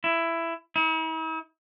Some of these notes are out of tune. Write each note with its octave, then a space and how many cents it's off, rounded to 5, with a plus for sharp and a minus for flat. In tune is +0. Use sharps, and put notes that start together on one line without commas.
E4 +15
E4 -45